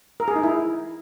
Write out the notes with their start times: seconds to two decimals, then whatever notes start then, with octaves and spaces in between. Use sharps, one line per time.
0.20 A#4
0.28 G#4
0.36 D#4
0.43 E4